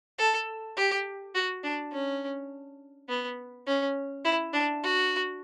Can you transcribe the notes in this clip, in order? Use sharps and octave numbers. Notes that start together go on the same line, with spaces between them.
A4
G4
F#4
D4
C#4
B3
C#4
E4
D4
F#4